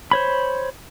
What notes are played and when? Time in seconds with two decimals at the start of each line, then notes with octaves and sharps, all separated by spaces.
0.11 C5 C#5 B5